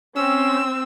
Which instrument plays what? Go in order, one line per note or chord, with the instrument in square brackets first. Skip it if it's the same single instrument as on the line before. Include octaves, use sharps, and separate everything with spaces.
[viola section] C4 [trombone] C#4 [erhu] E6